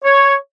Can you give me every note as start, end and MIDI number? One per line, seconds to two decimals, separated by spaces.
0.04 0.33 73